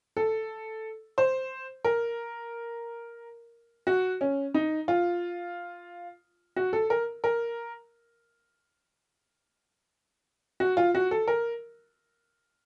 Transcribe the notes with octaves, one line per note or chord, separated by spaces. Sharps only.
A4
C5
A#4
F#4
C#4
D#4
F4
F#4
A4
A#4
A#4
F#4
F4
F#4
A4
A#4